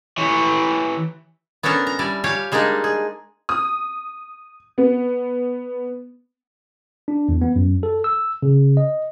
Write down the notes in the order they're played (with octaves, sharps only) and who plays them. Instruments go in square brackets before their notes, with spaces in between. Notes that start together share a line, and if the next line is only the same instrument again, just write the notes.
[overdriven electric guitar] E3 C#5
[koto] B3 C#4 D4 A4 A#4
A#5
G3 E4 D5
G4 C#5 F5 G#5
G3 G#3 A#3 D4 D#4
G#4
[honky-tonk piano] D#6
B3
[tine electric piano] D4
E2
B3
F#2
A4
E6
C#3
D#5